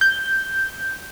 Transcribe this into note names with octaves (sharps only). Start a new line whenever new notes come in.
G6